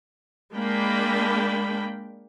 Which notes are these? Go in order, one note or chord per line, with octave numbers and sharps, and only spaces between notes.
G#3 A#3 D4 G5 B5